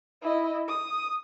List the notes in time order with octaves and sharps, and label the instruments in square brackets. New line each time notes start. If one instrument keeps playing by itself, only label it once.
[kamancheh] E4 D#5
D#6